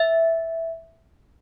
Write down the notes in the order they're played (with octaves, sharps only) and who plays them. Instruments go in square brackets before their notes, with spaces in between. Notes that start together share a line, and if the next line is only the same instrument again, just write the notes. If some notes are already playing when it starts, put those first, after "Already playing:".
Already playing: [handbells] E5